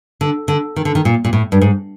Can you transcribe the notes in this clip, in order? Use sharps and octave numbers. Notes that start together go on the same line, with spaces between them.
D3
D3
D#3
D3
D#3
A#2
A#2
A2
G2
G#2